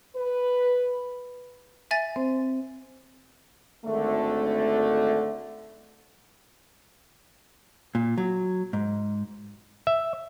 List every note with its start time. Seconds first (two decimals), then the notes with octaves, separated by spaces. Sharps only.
0.16 B4
1.91 E5 G#5 A6
2.16 C4 C5
3.85 G#1 D3 A3
7.95 A#2
8.18 F#3
8.73 G#2
9.87 E5